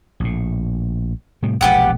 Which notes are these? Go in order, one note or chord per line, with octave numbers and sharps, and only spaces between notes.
A#1 A2
A2 C3 G3
E1 A#1 G#3 B3 G4 F#5